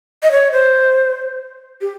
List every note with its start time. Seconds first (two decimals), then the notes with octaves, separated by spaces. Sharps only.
0.23 D#5
0.32 C#5
0.52 C5
1.81 G4